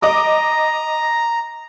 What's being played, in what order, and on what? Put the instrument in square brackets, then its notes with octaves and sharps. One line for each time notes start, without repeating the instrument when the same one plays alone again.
[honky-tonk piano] D#5 D6 D#6 [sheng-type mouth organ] A#5